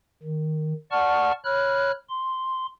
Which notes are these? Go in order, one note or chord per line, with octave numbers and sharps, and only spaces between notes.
D#3
D5 F#5 A5 C#6 F6
C#5 B5 F6 F#6
C6